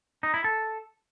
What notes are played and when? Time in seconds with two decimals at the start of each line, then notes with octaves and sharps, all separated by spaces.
0.23 D#4
0.34 E4
0.44 A4